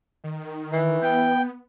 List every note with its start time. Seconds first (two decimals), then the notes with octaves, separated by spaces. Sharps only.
0.24 D#3
0.73 E3
1.02 B3 G5